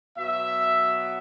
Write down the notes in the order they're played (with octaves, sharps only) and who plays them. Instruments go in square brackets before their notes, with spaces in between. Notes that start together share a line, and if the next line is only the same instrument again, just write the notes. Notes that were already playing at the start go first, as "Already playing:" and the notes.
[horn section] B2 F#3 E5